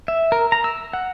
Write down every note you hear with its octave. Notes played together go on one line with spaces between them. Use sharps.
E5
A#4
A#5
E6
F#5